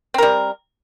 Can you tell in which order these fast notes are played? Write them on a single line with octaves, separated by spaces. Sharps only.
C4 A#4 G3